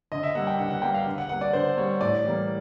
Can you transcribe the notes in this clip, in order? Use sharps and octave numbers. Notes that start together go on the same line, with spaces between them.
D3 D#5
E5
G3 A#3 F#5
G5
D3 F#5
F#5
G3 A#3 G5
F5
D3
F#5
G3 A#3 F#5
D5
D3 C5
G3 A#3 C#5
A2 D5
E3 G3 A#3